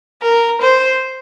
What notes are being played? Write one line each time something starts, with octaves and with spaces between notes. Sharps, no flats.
A#4
C5